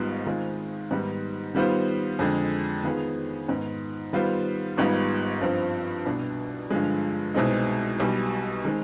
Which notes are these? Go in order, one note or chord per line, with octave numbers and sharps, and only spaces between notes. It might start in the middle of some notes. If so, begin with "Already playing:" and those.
Already playing: G#1 G#2 G3 B3 F4
D#3 G#3 C4 F4
G#2 D#3 G3 B3
D#3 G3 B3 F4 C5
F2 D3 G#3
D#3 B3 F4 G#4
G#2 D#3 B3
D#3 G3 B3 F4 C5
G#1 G#2 G3 B3 F4
G2 F3 C4
C2 B2 B3 D4
G2 D3 F3 G#3
C2 B2 G#3 C4 D#4
B1 B2 G3
D#3 G#3 C4